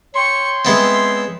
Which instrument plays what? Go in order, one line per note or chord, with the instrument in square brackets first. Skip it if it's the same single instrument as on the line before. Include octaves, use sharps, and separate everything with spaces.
[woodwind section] C#5 G5 C6 [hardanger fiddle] C#6
[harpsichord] G#3 B3 C4 [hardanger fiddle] E5